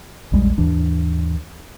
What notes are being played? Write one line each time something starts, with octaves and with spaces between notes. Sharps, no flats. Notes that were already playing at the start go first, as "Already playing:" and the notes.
A#1 E2 G3 G#3
D#2 G#2 E3 D4